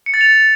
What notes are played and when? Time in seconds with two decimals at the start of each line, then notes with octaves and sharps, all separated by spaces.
0.06 C#7
0.14 A6
0.21 F7